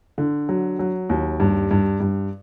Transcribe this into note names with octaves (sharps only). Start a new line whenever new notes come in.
D3
F#3
F#3
D#2
G2
G2
G2